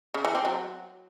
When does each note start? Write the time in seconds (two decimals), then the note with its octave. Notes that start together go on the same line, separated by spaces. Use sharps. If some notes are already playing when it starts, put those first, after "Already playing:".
0.14 C#3
0.25 E3
0.35 C4
0.45 F#3